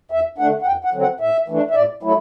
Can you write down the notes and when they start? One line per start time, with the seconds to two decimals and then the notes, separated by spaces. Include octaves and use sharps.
0.11 E2 E5
0.38 D3 A3 D4 F#5
0.62 F#5
0.66 E2 G5
0.84 F#5
0.93 D3 F#3 C4
1.02 F#5
1.20 A2 E5
1.48 E3 A3 D4
1.70 E5
1.74 A2 D5
2.03 F#3 A3 E4